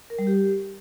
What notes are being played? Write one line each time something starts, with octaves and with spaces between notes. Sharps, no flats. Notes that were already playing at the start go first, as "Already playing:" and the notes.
A#4
G3
G4